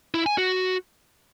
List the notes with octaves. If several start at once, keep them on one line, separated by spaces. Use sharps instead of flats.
E4
G#5
F#4